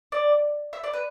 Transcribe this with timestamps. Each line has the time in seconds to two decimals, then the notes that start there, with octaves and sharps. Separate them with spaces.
0.12 D5
0.73 E5
0.84 D5
0.93 B4